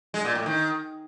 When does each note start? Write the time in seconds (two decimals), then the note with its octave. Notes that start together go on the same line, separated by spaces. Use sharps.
0.14 G#3
0.25 A#2
0.35 A2
0.46 D#3